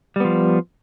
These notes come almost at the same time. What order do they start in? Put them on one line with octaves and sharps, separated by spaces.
G3 B3 F3